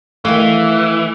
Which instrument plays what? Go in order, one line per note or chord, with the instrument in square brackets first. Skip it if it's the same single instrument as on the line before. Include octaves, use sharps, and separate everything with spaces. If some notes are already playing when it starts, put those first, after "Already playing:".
[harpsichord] D#3 A3 [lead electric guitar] E3 [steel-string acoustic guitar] E4 F5